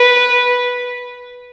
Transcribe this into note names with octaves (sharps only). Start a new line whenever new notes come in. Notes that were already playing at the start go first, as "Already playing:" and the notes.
Already playing: B4